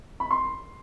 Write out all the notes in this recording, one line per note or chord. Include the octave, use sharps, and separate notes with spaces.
B5
C6